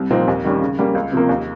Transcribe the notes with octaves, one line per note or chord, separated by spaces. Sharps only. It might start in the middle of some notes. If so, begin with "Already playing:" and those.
Already playing: C2
A#2 F3 C4 D#4
D#2
D#3 G3 C#4
C#3
G3 A#3 C#4
C#2
C3 F3 A#3
D#2